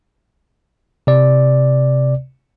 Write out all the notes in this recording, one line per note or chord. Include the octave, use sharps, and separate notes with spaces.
C3 D5